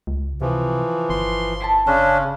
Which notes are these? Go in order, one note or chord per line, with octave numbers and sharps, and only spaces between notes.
C#2
C3 E3 F3
G1 C6
E4 G#5 A5
C#3 C#4 D4 C5